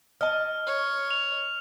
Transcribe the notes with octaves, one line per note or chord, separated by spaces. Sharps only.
D#5 A5 F6
C#5
F7